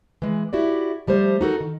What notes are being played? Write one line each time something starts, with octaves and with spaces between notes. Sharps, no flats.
E3 G#3
E4 F#4 G4 D5
F3 G3 A3 C5
D#4 F#4 A4 A#4
D#3